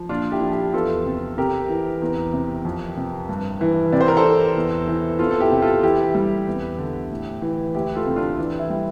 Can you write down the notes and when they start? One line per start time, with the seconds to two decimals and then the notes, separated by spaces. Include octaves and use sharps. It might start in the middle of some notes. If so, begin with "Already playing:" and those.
Already playing: F3
0.09 A#2 D4 F4
0.31 E4 G4
0.41 F3
0.52 E4 G4
0.73 E2 F4 A4
1.05 C3
1.37 C3 G4 A#4
1.69 E3
2.02 E2
2.33 C3
2.65 F2
2.97 C3
3.29 G2
3.61 E3
3.92 C3 D5
4.01 C5
4.08 A#4
4.17 A4 C5
4.24 E3
4.56 E2
4.87 E3
5.19 E2 F4 A4
5.31 A4
5.40 E4 G4
5.52 C3
5.62 F4 A4
5.83 E3 E4 G4
6.15 G3
6.47 E2
6.78 D3
7.11 A2
7.42 E3
7.75 D2 E4 G4
7.95 F4 A4
8.07 C3
8.16 D4 F4
8.38 E3
8.59 E4
8.70 G3